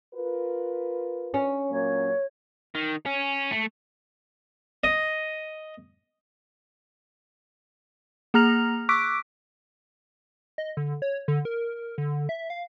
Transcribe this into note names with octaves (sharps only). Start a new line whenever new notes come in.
F4 A#4 B4
C#4
A#2 F#3 A#3 C#5
D#3
C#4
A3
D#5
A#3 G#4 A#5 F6 A#6 F7
C#6 D6 E6 F#6 B6 D7
D#5
D3
C#5
D3
A#4
D3
E5
F5